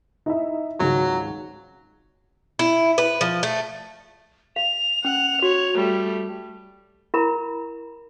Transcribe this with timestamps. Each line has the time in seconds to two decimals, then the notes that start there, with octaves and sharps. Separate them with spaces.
0.26 D#4 E4 E5
0.80 G#1 C#2 G#2 F#3
2.59 E4
2.98 B4
3.21 F3
3.43 A3
4.56 F5 F7
5.05 C#4 F#5
5.42 F#4 C#5
5.75 G3 A3
7.14 E4 A#4 A#5 B5